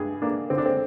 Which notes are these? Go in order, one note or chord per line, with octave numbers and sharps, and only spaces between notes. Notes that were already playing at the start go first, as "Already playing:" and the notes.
Already playing: G2 G#4
A#3 D4
D3 C4
D4
C4